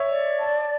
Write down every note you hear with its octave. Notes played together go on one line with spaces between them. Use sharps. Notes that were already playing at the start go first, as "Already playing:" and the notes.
Already playing: C#5 E5
D5
A5